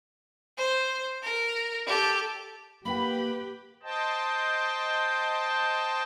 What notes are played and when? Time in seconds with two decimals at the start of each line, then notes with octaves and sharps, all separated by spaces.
0.58 C5
1.23 A#4
1.87 G4 A4
2.85 A#3 G4 B4 F#5 G5 B5
3.83 C5 D#5 G5 A5